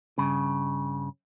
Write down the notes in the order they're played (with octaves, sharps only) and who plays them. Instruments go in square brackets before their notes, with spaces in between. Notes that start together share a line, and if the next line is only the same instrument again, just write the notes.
[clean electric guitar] G2 C#3